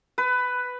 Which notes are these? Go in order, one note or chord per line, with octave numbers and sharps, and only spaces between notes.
B4